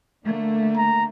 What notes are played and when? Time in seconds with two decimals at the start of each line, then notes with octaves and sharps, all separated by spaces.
0.25 D3 A3 A#3
0.77 A#5